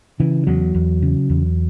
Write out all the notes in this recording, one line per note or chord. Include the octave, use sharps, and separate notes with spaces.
C#3 E3
E2 F#3
E2
C#3
E2